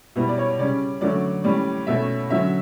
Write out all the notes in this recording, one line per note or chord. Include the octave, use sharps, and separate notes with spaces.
B2 G3 B3 E4
D5
C#5
C#3 G3 C#4 D5
D3 F#3 A3 C#4 D5
A2 G3 C#4 D5
B2 A3 C#4 E5
D3 F#3 C#4 E5